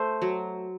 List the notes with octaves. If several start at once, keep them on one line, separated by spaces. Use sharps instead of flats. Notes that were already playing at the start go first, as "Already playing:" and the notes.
Already playing: A3 C5
F#3